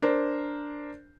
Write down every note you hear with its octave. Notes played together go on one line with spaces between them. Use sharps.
D4 A#4 C5